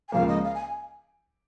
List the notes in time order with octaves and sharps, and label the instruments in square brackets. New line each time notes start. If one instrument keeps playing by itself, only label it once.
[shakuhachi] G#5
[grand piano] C#2 C#3 F3 A#3 [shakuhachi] F5
[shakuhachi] D#5
F5
G#5